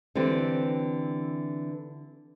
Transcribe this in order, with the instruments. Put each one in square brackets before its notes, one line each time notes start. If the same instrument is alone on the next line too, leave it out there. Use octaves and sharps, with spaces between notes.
[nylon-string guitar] D3 E3 C4 G4